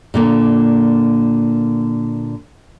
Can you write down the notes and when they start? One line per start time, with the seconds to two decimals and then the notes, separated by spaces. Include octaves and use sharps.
0.14 A#2 D3 A#3